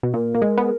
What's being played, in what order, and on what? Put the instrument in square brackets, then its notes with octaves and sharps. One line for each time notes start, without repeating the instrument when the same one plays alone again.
[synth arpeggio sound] B2
[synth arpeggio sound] A#2 [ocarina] A#4
[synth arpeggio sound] A#3
G#3
B3